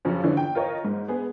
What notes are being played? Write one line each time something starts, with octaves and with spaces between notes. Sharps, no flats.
F2 C#3 F3 F#3 C#4
D3 E3 F3 C#4 D4
G5
F4 A#4 C#5 D#5
G#2
B3 G#4